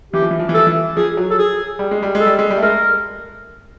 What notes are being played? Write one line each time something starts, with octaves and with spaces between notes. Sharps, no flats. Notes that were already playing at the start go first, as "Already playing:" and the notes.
E3 G4
F3
E3
F3
E3
F3 A4
E3
F3 G#4
F#3
A4
G#4
G3
G#3
G3
G#3
A4
G3
G#3
G3
A3
G#3 A#4